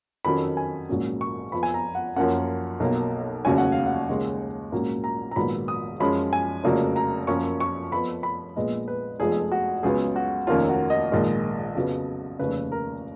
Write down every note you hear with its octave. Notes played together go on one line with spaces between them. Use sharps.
F2 D#3 F#3 C#4 B5
G#5
A#1 G#2 F#3 A#3 C#4
C#6
F2 F3 B3 B5
G#5
A#5
F#5
F#2 F3 A#3 C#4 F#5
B1 B2 A#3
F1 D#2 C#3 F#3 C#4 G#5
F#5
F5
F#5
D#2 C#3 G#3 C#4
A#1 G#2 F#3 A#3 C#4
A#5
A#5
A#1 G#2 D#3 F#3 B3 B5
D#6
F#2 F3 G#3 C#4 B5
G#5
F1 F2 C#3 F#3 A#3
A#5
F#2 F3 A#3 C#4 C#6
C#6
F2 F3 B3 B5
B5
A#1 A#2 G#3 B3 D#5
B4
F1 F2 F3 G#3 B3 G#4
F#4
C#2 C#3 F#3 B3 G#4
F#4
F1 D#2 D#3 A#3 C#4 F4
F#4
D#5
A#1 G#2 D#3 G#3
F2 C#3 F#3 B3
F1 D#2 C#3 B4
A#4